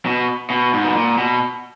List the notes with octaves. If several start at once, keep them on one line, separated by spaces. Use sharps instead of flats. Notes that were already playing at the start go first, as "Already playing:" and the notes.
B2
B2
G#2
B2
A#2
B2